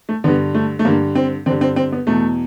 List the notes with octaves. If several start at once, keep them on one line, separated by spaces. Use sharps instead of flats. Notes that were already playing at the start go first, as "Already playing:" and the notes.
A3
G2 D3 B3
A3
A3
G2 D3 A#3
C4
G2 D3 C4
C4
C4
B3
E2 B2 A3